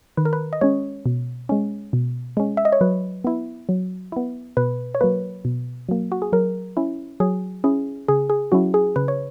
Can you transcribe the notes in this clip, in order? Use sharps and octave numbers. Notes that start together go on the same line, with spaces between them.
D#3 B4
A#4
B4
D#5
G#3 C#4 C#5
B2
G#3 C#4
B2
G#3 C#4
E5
D#5
C#5
F#3 B4
B3 E4
F#3
B3 E4
B2 B4
C#5
F#3 A#3 B4
B2
F#3 A#3
F#4
G#4
F#3 A#4
C#4 E4
F#3 G#4
C#4 E4 G#4
C#3 G#4
G#4
F#3 C#4 E4 F#4
G#4
C#3 B4
C#5